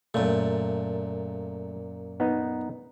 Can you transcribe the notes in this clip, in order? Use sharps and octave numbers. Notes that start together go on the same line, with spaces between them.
F#2 A#2 A3
B3 D#4